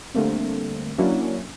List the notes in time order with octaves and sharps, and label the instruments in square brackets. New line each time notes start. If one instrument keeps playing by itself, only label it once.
[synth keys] D3 G3 A3 A#3 C4
F#3 A#3 C#4 D4 E4 F#4